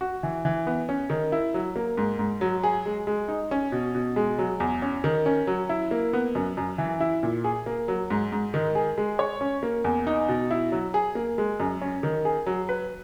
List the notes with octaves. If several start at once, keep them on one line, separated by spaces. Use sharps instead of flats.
F#4
E3
E3
B3
C#4
D#3
E4
F#3
A#3
G#2
G#2
F#3
G#4
G#3
G#3
D#4
C#4
B2
B2
G#3
F#3
E2
C#4
D#3
C#4
F#3
E4
A#3
B3
F#2
F#2
E3
E4
A#2
G#4
A#3
F#3
G#2
G#2
D#3
G#4
G#3
C#5
C#4
A#3
E2
D#4
B2
E4
F#3
G#4
A#3
G#3
F#2
C#4
D#3
G#4
F#3
B4